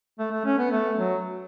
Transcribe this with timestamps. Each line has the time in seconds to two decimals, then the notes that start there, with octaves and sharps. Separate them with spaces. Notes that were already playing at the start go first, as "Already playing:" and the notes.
0.19 A3
0.32 A3
0.45 C#4
0.58 B3
0.71 A3
0.97 F#3